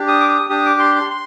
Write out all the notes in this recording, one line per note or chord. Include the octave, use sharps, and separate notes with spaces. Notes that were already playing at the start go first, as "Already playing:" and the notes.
Already playing: D4 G4
D#6
D6
D#6
D4 G4 D#6
D6
C6
C6
C6